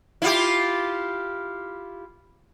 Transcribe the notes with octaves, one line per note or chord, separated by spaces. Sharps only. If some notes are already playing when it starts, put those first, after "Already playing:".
E4 F4 G4